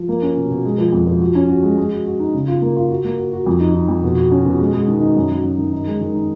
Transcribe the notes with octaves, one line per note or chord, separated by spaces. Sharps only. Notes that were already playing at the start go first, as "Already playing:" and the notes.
Already playing: F3
A#3
C#4
B2
B2
G#3
F3
F2
F3
F#4
C#4
F#4
G#3
G#3
F#4
F#4
D#4
C#3
F4
A#3
F4
F#4
A#3
F#4
F#4
F2
D#4
D#4
F2
B2
F#4
C#4
B2
G#3
G#3
D#3
D#4
F#2
F#3
F#2
D#3
D#4
G#3
D#3
D#4